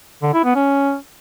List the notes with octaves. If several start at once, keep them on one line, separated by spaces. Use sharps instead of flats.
D3
E4
B3
C#4